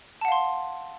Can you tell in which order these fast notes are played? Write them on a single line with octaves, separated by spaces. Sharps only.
A5 F#5 F5 C6